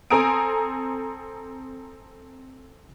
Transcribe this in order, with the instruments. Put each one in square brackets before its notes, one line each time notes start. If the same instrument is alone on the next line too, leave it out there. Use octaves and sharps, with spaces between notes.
[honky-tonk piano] C4 A4 G#5 A#5 D#6 D7